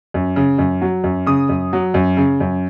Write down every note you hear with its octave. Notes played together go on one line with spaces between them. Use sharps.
F#2
C#3
F#2
F#3
F#2
C#3 D#6
F#2
F#3
F#2
C#3
F#2